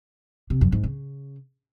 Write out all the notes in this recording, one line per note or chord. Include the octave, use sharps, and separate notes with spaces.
C3
F#2
G#2
C#3